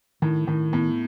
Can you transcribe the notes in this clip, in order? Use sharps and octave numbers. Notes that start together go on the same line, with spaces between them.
A2 D#3
A2 D#3
A2 B3